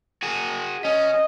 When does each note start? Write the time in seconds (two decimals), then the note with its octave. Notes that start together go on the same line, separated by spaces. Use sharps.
0.23 F#4 G#4
0.85 C#4 D#5